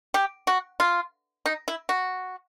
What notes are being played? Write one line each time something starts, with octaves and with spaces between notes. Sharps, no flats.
G4
F#4
F4
D#4
E4
F#4